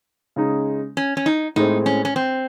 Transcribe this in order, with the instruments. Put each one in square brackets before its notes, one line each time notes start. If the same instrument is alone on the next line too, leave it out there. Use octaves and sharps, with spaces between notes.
[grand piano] C#3 G#3 D#4
[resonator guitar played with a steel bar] C#4
C#4
D#4
[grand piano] A2 G#3 C4 [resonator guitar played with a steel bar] D#4
[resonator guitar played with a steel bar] C#4
C#4
C4